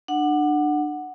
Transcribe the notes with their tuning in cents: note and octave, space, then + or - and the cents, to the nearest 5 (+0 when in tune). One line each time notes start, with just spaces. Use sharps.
D4 +30 F#5 +0